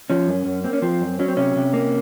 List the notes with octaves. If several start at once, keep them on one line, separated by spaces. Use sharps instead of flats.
F3 C#4
F#2
F#2
A#3 C4
C#4
F3 C4
F#2
F#3 C#4
C4
C3 C#4
C3
A#3